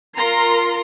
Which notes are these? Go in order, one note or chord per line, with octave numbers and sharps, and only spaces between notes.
F4 A#4 A#5 C6